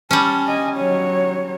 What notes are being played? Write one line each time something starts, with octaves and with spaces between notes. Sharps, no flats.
G3 C#4 A5
D#5 G#5
F#3 C#5